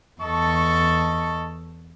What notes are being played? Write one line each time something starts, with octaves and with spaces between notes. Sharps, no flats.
E2 A4 D#5 A5 C#6